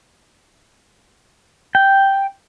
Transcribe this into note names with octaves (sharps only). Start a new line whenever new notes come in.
G5